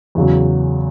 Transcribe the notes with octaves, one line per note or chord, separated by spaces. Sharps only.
E2 C#3 F#3